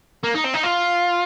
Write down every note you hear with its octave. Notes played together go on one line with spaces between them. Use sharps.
A#3
D#4
C4
D#4
F4